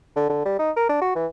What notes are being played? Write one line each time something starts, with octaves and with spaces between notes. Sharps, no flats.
D3
D3
G3
D#4
A#4
D4
F#4
E3